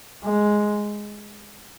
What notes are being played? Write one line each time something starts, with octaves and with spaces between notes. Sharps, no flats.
G#3